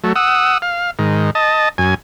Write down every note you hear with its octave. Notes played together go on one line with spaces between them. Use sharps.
F#3 A3
F#5 D#6 E6
F5
G#2 D#3
D#5 A5
F#2 G#5